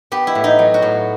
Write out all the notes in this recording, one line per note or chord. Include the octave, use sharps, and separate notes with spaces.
B3 G4
E4
A2
D#4
F#3
F#4
A2